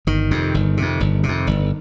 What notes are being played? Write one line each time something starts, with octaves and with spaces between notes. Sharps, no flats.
G1 D#3
F2 C3
G1
F2 C3
G1
C3
F2
G1